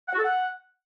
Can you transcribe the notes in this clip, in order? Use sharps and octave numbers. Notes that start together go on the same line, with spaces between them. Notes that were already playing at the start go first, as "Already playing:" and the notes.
F#5
F#4
A4
F#5